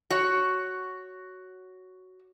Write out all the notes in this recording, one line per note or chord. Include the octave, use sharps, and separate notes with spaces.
F#4 C#5